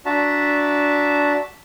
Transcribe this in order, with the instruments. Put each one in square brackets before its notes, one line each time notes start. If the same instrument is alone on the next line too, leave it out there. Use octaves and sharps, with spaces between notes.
[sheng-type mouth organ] D4 F#4 E5 A5 A#5